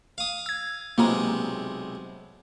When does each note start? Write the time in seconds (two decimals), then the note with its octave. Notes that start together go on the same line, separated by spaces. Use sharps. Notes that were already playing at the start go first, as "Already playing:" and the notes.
0.18 F5 D#6
0.46 E6 G#6
0.98 B1 C3 G#3 A#3 F4 A#5